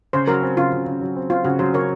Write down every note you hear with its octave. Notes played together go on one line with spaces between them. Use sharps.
C#3 C5
F#3 A#4
C4
C#3 F4
C#3
C#3
F#3
C4
C4 F4
C#3 F#4
F#3 C5
C#3 A#4 C#5